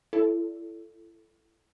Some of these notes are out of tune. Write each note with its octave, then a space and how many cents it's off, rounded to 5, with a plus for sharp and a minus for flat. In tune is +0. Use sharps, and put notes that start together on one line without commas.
E4 +30 A4 +0 D5 -15